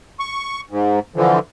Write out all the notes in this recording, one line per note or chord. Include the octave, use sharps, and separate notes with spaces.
C#6
G#2
D3 E3 F3